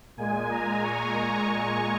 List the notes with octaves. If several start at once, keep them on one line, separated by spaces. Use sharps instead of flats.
A#2 G#3 G#5
A#5
C#6
A#5